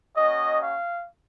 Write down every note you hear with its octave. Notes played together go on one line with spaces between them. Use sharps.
A#3 C#4 F#4 D#5
F5